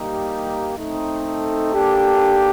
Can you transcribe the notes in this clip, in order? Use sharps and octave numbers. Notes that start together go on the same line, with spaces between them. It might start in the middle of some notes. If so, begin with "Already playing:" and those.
Already playing: G3 A#3 D#4 G4
A3 C4 D#4
A4
A#3 D4 G4